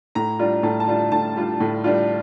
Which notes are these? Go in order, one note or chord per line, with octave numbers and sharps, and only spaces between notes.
A2 A#5
G3 D4 F4
A2 A5
A5
G3 D4 F4
A2 A5
G3 D4 F4
A2
G3 D4 F4